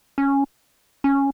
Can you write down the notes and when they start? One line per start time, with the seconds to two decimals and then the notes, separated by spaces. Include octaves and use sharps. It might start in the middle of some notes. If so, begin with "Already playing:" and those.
0.18 C#4
1.04 C#4